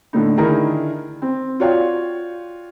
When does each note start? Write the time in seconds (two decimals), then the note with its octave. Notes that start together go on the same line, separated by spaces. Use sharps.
0.13 A2 D3 A3 D#4
0.37 D3 D#3 D#4 E4 G#4 A#4
1.22 C4
1.60 F4 F#4 C#5 D5 F5 G5